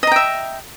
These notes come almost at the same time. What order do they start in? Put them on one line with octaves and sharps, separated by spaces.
D#5 A#5 G5 E5